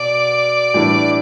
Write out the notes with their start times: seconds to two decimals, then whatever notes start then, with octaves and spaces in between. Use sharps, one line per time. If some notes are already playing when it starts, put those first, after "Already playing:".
Already playing: B2 D5
0.74 A2 E3 G3 D4